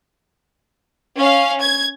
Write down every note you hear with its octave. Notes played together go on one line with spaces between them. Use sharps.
C#4 F5
G#6